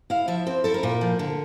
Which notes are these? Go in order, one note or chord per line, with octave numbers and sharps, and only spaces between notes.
E4 F5
F3 E5
C4 C5
E4 A4
A#4
A#2
F3
D3